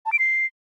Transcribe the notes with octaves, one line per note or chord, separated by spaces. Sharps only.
A5
D7
C7